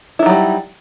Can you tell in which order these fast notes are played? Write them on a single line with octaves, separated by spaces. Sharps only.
E4 D#4 F#3 G3